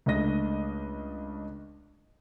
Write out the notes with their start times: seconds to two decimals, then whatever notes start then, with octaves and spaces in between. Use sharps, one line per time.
0.06 C#2 A3 D4 D#5 A#6